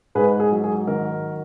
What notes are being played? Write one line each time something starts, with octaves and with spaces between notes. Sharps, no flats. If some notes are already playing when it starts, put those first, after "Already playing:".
G#2 G#4 B4
G#4
F#3
G#4
D#3 A#4